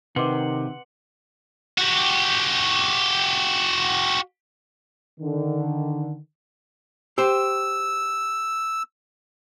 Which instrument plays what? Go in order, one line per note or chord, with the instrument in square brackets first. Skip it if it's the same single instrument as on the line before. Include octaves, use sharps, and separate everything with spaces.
[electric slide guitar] C3 [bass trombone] D#3 [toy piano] B4 D#5 D6 [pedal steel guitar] F#5 C6
[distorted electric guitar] F#4 G4
[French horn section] D3 D#3
[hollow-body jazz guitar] G4 C5 [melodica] E6